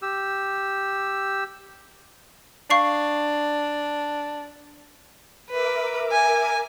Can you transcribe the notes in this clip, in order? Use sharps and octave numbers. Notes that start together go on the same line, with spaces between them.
G4 E6
D4 F5 C#6 C7
A#4 B4 E5 D6
G#5